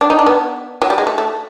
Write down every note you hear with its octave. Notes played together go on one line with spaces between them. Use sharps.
D4
D#4
D4
B3
F#3
G3
G#3
A3
A3